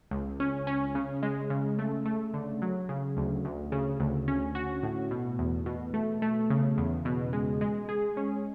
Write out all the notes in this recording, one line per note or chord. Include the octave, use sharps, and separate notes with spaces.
C#2
C#4
C#4
C#3
G#3
C#3
A3
A3
D3
F#3
C#3
D2
D2
C#3
D2
C#4
F#4
A2
B2
E2
B2
A3
A3
C#3
E2
B2
G#3
G#3
G#4
C#4